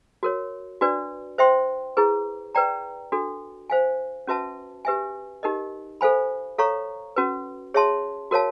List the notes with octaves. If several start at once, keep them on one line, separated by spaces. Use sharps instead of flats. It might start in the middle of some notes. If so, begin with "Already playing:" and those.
F#4 A#4 C#5
D4 F#4 B4 D5
C5 E5 G5 C6
E4 G#4 B4
B4 D5 G5 A#5
D4 F#4 A4
C5 F5 G#5
C#4 F#4 B4 E5 A5
G4 B4 E5 G#5
D#4 G4 A#4 D#5
A4 C5 F5 G#5 B5
A4 C#5 F5 A#5 C#6
C#4 F#4 B4
G#4 C#5 E5 A5 C6
F#4 A#4 C#5 F5 A5